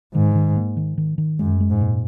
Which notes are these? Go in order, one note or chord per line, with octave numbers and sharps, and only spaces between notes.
G#2 D#3
D#3
A#3
D#3
D#3
D#3
F#2 G#3
G#3
G#2
A#2